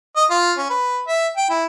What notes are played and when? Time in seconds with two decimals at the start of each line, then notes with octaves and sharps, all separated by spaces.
0.16 D#5
0.30 F4
0.57 C#4
0.70 B4
1.08 E5
1.37 G5
1.50 E4